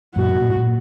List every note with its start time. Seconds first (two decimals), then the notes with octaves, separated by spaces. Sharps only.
0.16 F#2 A#2 F#4
0.34 B2
0.41 A#2
0.49 G#2
0.56 A#2